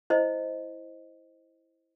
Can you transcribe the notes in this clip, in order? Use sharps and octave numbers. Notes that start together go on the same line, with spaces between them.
E4 C5 D#5